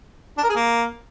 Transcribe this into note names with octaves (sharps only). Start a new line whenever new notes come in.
D4
A#4
G#4
A#3